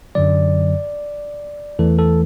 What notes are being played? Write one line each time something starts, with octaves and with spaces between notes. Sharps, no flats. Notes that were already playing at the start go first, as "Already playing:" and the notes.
F#2 D3 F#3 D5
E2 E3 A3 A4
A4